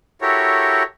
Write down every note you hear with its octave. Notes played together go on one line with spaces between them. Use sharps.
E4 F#4 G4 A4 A#4 C#5